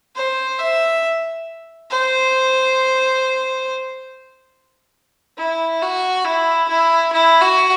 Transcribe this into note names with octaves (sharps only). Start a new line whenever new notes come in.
C5
E5
C5
E4
F#4
E4
E4
E4
F#4